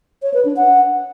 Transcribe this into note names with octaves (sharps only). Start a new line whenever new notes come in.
C#5
B4
D4
F#5